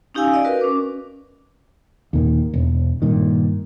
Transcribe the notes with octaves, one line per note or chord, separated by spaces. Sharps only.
C#4 D#4 G4 F5 G#5 E6
D5 D#5 F5
F#4 A#4 B4
C#4 D6
D#2 A#2 D#3
E1
G2 A#2 D#3